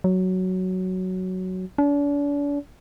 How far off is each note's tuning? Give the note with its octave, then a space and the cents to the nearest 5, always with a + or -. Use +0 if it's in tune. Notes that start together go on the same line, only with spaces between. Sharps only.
F#3 +5
D4 -40